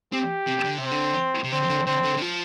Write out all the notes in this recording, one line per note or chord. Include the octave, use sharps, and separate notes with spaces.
C4 G4
C3
D3
C3 C4
D3
C3
D3 C4
D3
D3 C4
D3
D3
F3